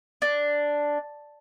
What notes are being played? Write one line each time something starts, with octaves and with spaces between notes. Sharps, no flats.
D4